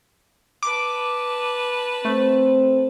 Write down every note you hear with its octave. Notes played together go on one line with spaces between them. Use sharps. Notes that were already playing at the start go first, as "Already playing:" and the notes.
B4 A5 D6
A3 C4